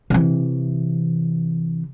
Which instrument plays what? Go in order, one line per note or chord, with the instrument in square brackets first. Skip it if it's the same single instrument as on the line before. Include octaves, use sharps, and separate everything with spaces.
[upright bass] C3 E3